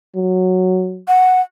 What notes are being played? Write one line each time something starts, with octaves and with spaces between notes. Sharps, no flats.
F#3
F#5